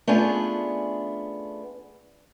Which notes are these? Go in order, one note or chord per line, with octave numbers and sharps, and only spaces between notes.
A3 B3 C#4 D4 F4 G#4